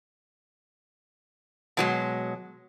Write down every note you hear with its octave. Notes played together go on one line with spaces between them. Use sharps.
B2 F#3 G#3